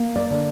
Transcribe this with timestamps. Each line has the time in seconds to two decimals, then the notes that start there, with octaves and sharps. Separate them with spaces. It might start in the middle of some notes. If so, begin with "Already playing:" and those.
Already playing: A#3
0.16 D5
0.30 D3